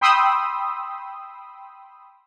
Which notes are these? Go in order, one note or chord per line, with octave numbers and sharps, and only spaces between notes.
G5 B5 C6 D#6 E6